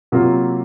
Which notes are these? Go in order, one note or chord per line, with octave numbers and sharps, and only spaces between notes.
C3 F#3 A#3 F4